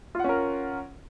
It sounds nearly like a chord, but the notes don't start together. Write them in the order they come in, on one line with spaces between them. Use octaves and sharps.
F4 F#5 C#4 A#4